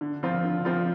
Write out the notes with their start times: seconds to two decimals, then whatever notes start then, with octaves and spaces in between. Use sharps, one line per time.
0.01 D3
0.23 F3 C4 F4
0.44 D3
0.65 F3 C4 F4